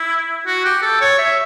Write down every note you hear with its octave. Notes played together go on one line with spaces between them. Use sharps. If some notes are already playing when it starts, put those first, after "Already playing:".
Already playing: E4
F#4
G4
A4
C#5
E5